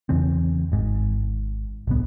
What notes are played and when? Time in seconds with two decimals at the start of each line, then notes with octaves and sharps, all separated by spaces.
0.09 E2 C#3 E3 C4
0.72 G#1 G#2
1.87 D1 C2 B3